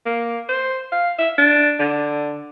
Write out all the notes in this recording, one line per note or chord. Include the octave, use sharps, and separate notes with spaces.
A#3
C5
F5
E5
D4
D3